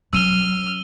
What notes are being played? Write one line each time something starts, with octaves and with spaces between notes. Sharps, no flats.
F#3 C#4 E6 F6 D#7 G7